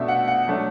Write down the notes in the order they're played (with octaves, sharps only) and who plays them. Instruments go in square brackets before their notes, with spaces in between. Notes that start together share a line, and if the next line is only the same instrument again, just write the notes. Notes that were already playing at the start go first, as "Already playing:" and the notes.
Already playing: [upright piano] B2 A3 D4 E5
F#5
F#5
F#3 A3 D4